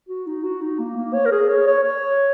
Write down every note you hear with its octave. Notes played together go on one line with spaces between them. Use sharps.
F#4
D#4
F#4
D#4
A#3
A#3
C#5
A#4
G#4
C#5
C#5
C#5